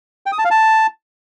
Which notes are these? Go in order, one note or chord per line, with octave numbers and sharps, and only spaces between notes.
G5
D#6
A5
F5
A5